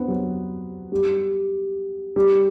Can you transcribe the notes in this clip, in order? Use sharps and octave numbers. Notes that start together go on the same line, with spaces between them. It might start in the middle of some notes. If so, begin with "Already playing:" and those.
Already playing: B3 C4 D4
F#3
G3
G3